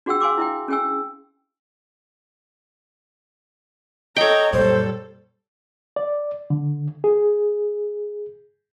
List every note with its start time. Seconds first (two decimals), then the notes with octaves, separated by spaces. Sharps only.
0.06 D4 F#4 G#4 F#5 G5 E6
0.20 F5 G#5 C6 D6 E6
0.38 E4 E5 G5
0.68 C#4 G#4 G5 G#5 E6
4.16 A4 C#5 D#5 G5 A#5
4.53 F#2 A#2 G3 A4 C5
5.96 D5
6.50 D3
7.04 G#4